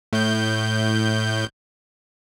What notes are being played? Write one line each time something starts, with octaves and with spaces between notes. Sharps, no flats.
A2 G6